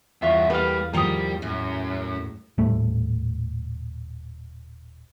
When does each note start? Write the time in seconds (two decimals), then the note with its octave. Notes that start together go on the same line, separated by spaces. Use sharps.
0.22 E2 G2 F4 E5 F#5 C#6 D#7
0.50 G3 A#3 A4 B4 F5 B6
0.93 G#2 D#3 F3 G3 A#3 A#5 D#6 C#7
1.42 F#2 A2 A#6
2.58 D#1 A2 G3 A3